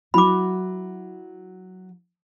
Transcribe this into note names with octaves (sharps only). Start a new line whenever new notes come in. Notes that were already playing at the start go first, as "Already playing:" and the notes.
F#3 E4 F#4 B5 D6